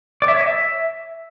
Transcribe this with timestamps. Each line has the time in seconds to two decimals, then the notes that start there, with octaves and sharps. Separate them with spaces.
0.22 D5
0.28 E5
0.34 C#5
0.40 D#5
0.46 E5